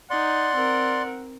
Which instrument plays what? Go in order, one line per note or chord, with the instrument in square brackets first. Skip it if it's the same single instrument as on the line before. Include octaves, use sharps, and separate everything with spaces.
[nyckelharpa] D#4 [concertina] D5 C6 [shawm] F#5
[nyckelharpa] C4 A#4